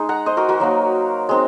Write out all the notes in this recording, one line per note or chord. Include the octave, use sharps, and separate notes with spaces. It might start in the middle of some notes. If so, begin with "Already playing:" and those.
Already playing: G#3 D#4
F#5 A#5
C5 D#5
F#4 A#4
F#4 A#4
F#3 A#3 D#4
G#3 C4 D#4